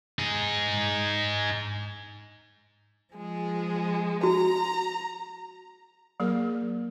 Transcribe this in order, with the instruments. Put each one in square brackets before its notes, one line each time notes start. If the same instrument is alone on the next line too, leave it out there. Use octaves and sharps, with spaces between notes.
[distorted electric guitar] D#4 G#4
[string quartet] F3 G#3
[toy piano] F#4 [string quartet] A#5
[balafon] F#3 A#3 G#4 A#4